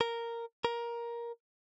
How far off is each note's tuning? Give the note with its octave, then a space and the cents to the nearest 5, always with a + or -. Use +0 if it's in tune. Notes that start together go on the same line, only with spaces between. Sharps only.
A#4 -5
A#4 +15